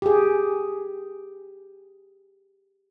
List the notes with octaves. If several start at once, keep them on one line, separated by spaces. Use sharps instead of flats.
G4 G#4